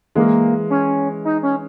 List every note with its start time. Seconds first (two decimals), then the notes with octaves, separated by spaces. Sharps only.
0.16 E3 G#3 A#3
0.70 C#4
1.25 D#4
1.43 C#4